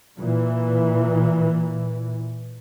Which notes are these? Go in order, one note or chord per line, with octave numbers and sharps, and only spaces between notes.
A#2 E3